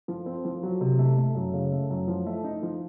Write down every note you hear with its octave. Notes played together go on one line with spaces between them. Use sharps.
F3
C4
F3
F#3
C3
A3
A3
F#2
C#3
A3
F#2
F3
A3
D#4
F3